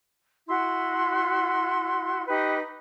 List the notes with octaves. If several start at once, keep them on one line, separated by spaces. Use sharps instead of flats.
E4 F#4 C6
D#4 G4 B4